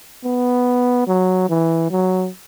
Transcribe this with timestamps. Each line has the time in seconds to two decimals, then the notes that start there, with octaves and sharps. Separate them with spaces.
0.25 B3
1.07 F#3
1.49 E3
1.91 F#3